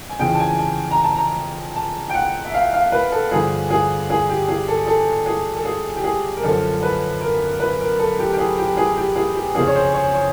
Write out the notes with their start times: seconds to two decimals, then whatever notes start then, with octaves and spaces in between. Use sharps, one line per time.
0.10 G#5
0.19 F2 C#3 E3 G5
0.34 A5
0.40 G#5
0.59 A5
0.91 A#5
1.04 A5
1.17 A#5
1.76 A5
2.09 G5
2.14 F#5
2.45 E5
2.54 F5
2.73 F5
2.92 B4
3.12 A4
3.31 G2 D3 F3 G#4
3.70 G#4
4.10 G#4
4.29 G4
4.48 G#4
4.68 A4
4.87 A4
5.26 G#4
5.56 A4
5.65 G#4
5.95 G4
6.04 G#4
6.37 A#4
6.43 F#2 D3 F3 A4
6.82 B4
7.21 A#4
7.60 B4
7.80 A#4
7.99 A4
8.19 G4
8.33 G4
8.38 G#4
8.58 G4
8.77 G#4
8.97 G4
9.16 G#4
9.36 G4
9.55 F2 C#3 F3 G#4
9.67 C#5
9.75 C5
9.94 C#5
10.14 C#5